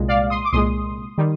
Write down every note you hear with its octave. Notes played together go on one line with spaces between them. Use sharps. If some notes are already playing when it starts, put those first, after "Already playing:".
Already playing: C2 A#2 G#3
D5 F5
C6 D#6
D6
C2 A#2 G#3 C6 D#6
D#3 G3